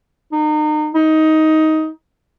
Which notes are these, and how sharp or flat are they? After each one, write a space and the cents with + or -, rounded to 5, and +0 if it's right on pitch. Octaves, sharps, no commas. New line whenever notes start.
D#4 -35
D#4 +15